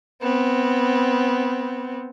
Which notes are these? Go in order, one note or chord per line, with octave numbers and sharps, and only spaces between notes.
B3 C4